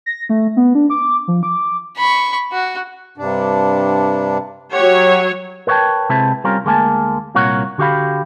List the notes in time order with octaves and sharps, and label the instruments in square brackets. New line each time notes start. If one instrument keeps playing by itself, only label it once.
[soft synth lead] A#6
A3
B3
D4
D6
F3
D6
[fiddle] B5 C#6
F#4
[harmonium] G2 C3 D4
[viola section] F#3 C#5 [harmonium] G4 F#5
[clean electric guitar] A#4 B4 C#5 D#5 G5 A5
C3 G#3 C4 E4 B4 A5
G3 C4 C#4 F4 A#4
D2 G#3 A#3 G#5 A5
C2 A#2 F4 A#4 C#5 F#5
D3 F#4 G4 F5 B5